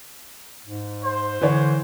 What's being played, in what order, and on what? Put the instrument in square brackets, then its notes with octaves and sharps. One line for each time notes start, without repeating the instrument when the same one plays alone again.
[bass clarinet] G#2
[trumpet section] C5
[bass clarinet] D3 [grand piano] E3 C#5